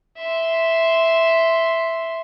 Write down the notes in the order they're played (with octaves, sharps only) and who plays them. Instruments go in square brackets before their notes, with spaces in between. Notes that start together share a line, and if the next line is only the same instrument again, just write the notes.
[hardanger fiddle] E5 C6